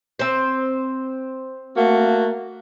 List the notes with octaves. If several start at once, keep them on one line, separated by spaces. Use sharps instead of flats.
C4 C5
A3 A#3 F#4